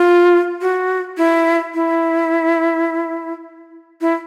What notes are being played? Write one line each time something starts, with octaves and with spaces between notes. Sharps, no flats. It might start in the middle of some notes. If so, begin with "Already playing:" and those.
Already playing: F4
F#4
E4
E4
E4